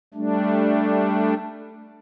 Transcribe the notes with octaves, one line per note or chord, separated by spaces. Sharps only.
G3 A3 D4